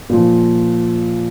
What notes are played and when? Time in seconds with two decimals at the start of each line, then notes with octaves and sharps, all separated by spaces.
0.09 A#2 F3